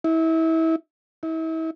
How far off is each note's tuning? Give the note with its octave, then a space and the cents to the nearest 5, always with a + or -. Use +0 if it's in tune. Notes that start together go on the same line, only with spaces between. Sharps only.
E4 -30
E4 -40